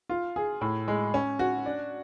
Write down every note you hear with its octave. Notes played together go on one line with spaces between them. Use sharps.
F4
G#4
A2
G#3
C#4
F#4
D4